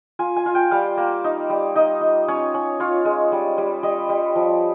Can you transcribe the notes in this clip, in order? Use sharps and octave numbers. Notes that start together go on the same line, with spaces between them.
F4 G#5
G#5
F4
G5
G3 F5
A#3
D#4
G3
D#4 D#5
D#4
C#4 C#5
C#4
F4 C#5
G#3
G3
G3
G3 D#5
G3
F3